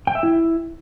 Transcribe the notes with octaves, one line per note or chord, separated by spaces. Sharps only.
G5
E5
E4